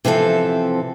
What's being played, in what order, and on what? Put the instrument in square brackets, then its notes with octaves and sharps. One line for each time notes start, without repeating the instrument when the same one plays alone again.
[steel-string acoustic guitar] C3 E3 F3 C4 A4